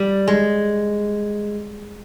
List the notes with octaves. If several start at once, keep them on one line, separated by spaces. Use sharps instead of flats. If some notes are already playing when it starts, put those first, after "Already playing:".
Already playing: G3
G#3